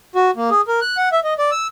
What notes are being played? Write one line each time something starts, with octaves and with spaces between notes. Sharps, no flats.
F#4
A#3
G#4
A#4
F#6
F#5
E5
D#5
D5
E6